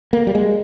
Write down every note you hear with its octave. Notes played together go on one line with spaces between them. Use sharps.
A#3
G3
G#3